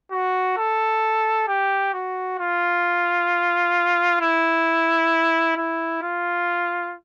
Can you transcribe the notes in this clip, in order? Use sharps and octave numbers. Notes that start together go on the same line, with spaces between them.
F#4
A4
G4
F#4
F4
E4
E4
F4